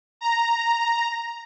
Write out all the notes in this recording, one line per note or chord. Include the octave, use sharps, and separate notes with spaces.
A#5